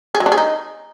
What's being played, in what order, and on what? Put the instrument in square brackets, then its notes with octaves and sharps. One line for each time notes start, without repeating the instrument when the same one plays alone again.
[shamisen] G#4
F#3
D4
G#4
D#4